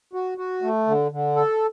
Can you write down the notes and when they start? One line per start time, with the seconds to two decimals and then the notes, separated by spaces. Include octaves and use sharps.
0.13 F#4
0.38 F#4
0.62 A3
0.87 D3
1.12 D3
1.36 A4